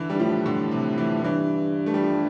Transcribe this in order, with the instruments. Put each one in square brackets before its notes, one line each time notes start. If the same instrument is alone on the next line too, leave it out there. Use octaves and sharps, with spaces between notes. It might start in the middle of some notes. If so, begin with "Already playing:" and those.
Already playing: [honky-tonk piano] D3 E3
G3
[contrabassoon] G2
[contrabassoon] A2 [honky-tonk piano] F3
[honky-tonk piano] D3
C3
E3
[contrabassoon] G2 [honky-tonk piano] E3
[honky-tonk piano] A3
G3
F3